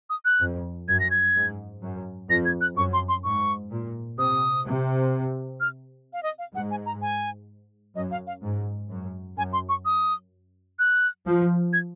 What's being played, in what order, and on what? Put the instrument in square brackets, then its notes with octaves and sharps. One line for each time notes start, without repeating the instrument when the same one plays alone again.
[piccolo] D#6
F#6
[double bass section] F2
[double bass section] F#2 [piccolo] G#6
[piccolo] A#6
G#6
[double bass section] G#2
F#2
[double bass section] F2 [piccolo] A#6
[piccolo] G#6
F#6
[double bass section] F#2 [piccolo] C#6
[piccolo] C6
C6
[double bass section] G#2 [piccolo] C#6
[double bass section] A#2
[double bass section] C3 [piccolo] D#6
[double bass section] C3
[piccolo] F6
F5
D#5
F5
[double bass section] G#2 [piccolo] F#5
[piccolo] G#5
A#5
G#5
[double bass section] F#2 [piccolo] D#5
[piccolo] F5
F5
[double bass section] G#2
F#2
[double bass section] F#2 [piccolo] G#5
[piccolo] C6
C#6
D#6
F#6
[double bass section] F3
[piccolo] G#6